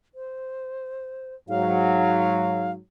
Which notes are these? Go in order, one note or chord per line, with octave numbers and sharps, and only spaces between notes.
C5
G#2 F#3 F5